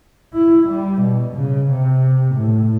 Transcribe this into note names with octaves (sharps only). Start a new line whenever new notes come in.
E4
G3
B2
C#3
C3
A2